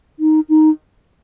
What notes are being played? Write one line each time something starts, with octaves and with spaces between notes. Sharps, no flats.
D#4
D#4